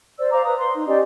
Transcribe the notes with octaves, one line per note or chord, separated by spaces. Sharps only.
C5 D5 E6
C5 F5 A#5 D6
B4 D#6
C6
D#4
C#4 G4 D5 D#5